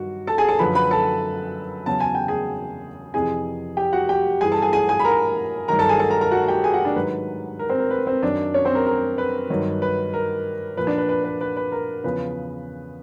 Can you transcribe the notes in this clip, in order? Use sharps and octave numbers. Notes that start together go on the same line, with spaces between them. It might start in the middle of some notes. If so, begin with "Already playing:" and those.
Already playing: G2 D#3 F#3 F#4
A4 A5
G#4 G#5
A4 A5
F#2 D3 F3 B4 B5
B4 B5
A4 A5
E2 C#3 F#3 A5
G#5
G5
G#4 G#5
F2 C3 E3 G#4 G#5
G4 G5
F#4 F#5
G4 G5
G2 E3 G#4 G#5
A4 A5
G#4 G#5
G#4 G#5
G#4 G#5
B5
A#4 A#5
G2 D#3 F#3 A#4 A#5
A4 A5
G#4 G#5
A4 A5
A#4 A#5
A#4 A#5
F#4 F#5
G4 G5
G#4 G#5
F#4 F#5
D4 D5
G#2 D#3 F#3 B4
A#4
C4 C5
A#4
B4
C4 C5
F#2 D#3 F#3 D4 D5
C#4 C#5
C4 C5
A#4
A#4
B4
G2 D#3 F#3
B4
A#4
A#2 F3 B4
D4 D5
B4
B4
B4
B4
B4
A#4
E2 C#3 F3 B4